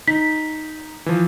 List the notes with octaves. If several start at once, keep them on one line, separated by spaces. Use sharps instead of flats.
D#4 B6
E3 F3